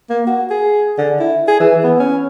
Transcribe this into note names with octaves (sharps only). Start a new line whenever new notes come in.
A#3
F#4
G#4
D3
E4
G#4
E3
B3
C#4